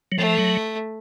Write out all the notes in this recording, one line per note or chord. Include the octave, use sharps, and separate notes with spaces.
F#3
F3 A3
F#3